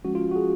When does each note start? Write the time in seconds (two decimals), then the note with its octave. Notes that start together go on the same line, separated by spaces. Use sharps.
0.04 F3 G#3 C#4 F#4
0.15 F4
0.31 F#4
0.36 G#4